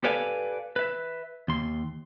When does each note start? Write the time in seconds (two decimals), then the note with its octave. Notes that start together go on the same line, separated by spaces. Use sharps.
0.04 G4 A4 B4 D5 F5 G#5
0.76 B4 E5
1.48 D#2 C6